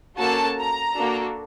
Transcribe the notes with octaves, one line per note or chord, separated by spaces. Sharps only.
A#3 C#4 F#4 A4 A5
A#5
A#3 D4 F#4 A4